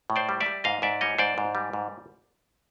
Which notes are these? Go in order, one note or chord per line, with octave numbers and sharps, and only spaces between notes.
A2
C5 D5
G3
D5 E5
G3
G#2 D#5 F5
G#2 D5 E5
G3 C#5 D#5
G#2 C5 D5
G#2
G3
G#2